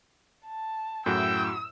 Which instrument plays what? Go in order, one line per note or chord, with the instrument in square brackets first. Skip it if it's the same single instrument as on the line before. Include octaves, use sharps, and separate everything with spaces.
[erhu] A5
[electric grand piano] F#2 A2 E4 [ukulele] F#4 G#4 [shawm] G5 [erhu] E6